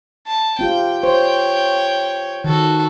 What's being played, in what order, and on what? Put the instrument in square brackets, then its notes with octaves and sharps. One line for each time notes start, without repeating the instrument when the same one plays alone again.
[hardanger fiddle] A5
[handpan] C4 F4 G4 [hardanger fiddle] G5
[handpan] C5 [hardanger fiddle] C#5 G5
[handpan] D#3 [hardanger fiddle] F#4 A4